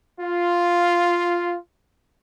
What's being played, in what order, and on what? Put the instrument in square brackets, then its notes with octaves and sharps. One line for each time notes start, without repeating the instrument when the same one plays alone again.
[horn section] F4